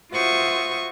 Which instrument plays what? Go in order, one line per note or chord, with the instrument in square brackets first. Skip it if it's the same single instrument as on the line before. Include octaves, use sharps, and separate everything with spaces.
[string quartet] F4 F#4 C5 E5 C#6 D#6